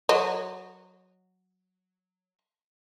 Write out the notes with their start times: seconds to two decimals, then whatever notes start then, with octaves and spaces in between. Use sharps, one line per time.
0.09 F#3 D#5